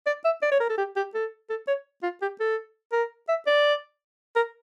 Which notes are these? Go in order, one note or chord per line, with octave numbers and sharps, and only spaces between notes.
D5
E5
D5
C#5
A#4
A4
G4
G4
A4
A4
C#5
F4
G4
A4
A#4
E5
D5
A#4